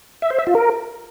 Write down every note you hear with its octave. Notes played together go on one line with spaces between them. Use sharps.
E5
C5
E5
F4
A#4